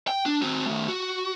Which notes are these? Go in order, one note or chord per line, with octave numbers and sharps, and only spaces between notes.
G5
D4
C4 F#4
D#3 A3
F#4